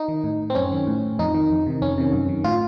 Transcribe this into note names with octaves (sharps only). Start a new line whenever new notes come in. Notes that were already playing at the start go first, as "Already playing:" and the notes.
Already playing: D#4
D#3
A2
C4
F#2 C#4
D#3
A2
F2 D#4
D#3
F2
C3 D#3
F2 C#4
C3 D#3
F#2
D#3
A2 F4